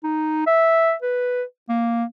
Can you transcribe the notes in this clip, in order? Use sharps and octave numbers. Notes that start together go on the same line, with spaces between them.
D#4
E5
B4
A#3